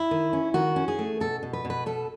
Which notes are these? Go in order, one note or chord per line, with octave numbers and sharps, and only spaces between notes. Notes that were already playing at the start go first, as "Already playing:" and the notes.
Already playing: E4
D#3
C#4
D#3 F#4
C#4
G#4
A3
B2 A4
B2
B4
B2
B4
B2 A4